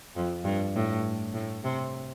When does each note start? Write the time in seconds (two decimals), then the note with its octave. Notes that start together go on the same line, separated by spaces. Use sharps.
0.16 F2
0.45 G2
0.75 A2
1.34 A2
1.64 C3